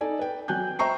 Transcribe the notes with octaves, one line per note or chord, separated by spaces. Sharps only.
D#4 A4 D5 G#5
B4 G5
F#3 G5 G#5 F#6 G6
C5 E5 G5 A#5 C#6 C7